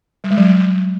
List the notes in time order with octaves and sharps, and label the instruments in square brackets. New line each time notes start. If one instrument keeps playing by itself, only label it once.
[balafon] G3
G#3
F#3